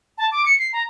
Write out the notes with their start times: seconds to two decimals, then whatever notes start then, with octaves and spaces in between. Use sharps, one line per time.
0.18 A5
0.32 D6
0.46 C#7
0.59 C7
0.73 A#5